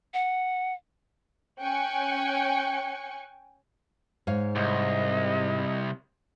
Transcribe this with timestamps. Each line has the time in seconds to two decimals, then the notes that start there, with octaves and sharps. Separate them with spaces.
0.14 F#5
1.61 C#4 G5 G#5 C#6 F#6 C#7
4.27 G#2 C#5 F5
4.55 C2 D#5